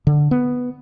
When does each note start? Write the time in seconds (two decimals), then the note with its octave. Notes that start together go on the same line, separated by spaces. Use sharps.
0.07 D3
0.31 B3